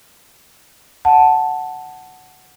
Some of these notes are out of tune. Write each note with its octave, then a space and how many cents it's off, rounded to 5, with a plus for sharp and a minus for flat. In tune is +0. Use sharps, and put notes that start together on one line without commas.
F#5 +0 A5 +0